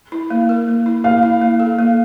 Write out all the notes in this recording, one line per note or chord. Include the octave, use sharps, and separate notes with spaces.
E4
A#3
A#4
A#3
E4
A#3 F5
E4
A#3
A4
A#3